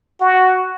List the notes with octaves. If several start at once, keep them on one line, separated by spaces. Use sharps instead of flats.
F#4